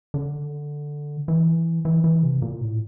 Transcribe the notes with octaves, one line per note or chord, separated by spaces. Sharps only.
D3
E3
E3
E3
C3
A#2
A2